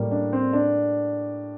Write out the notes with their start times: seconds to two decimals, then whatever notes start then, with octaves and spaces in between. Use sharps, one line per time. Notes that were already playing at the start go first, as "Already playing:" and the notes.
Already playing: A2 G3 A#3
0.11 D4
0.33 C4
0.53 D4